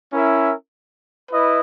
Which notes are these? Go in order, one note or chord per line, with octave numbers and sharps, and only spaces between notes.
C#4 E4 A#4 E5
E4 B4 D#5